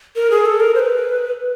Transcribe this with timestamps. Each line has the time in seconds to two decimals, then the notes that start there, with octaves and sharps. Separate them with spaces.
0.16 A#4
0.31 G#4
0.46 A4
0.60 A#4
0.75 C5
0.79 B4